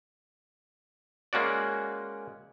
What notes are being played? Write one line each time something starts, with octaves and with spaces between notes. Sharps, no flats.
G#3 A#3 C#4 F#4 D5